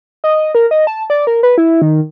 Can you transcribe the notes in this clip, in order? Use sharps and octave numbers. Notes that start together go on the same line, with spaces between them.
D#5
A#4
D#5
A5
D5
A#4
B4
E4
D#3